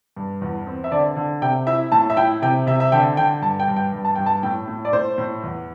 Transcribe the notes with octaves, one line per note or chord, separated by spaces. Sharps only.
G2
E2
C4
E5
D3 D5
D3
C3 G5
E4 E5
A2 A5
E5
E4 G5
C3 G5
C3 E5
E5
D3 G5
D3 G5
G2 A5
G5
G2
G5
G2
A5
G2 G5
A5
A2 G5
A2
D5
A2 C5
A2
E2